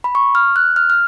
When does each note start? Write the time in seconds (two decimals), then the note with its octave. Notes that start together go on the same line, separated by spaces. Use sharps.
0.04 B5
0.15 C#6
0.35 F6
0.56 F#6
0.76 F6
0.90 F6